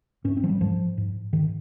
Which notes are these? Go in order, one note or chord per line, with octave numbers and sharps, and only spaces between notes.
G#2 C#4
C4
F3
G3
G#2 F3
G#2
G#2 D#3